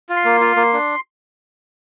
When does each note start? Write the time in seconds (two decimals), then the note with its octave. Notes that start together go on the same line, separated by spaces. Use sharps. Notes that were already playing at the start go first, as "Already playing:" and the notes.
0.09 F4
0.16 C6
0.25 A#3
0.41 F4
0.56 A#3
0.73 D4